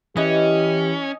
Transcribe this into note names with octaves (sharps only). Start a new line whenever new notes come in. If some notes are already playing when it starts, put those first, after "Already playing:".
E3 C#4 G4 D#5